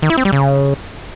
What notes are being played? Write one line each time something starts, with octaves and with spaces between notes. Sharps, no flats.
D#3
E4
C4
G3
C#3